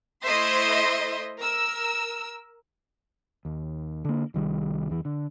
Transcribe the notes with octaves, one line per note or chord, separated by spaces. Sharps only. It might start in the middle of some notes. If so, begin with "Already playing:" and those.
A3 E4 C5 D#5 E5 C6
A#4 E6
D#2
D3 A#3
C2 D#3 G3
E2 E3
D3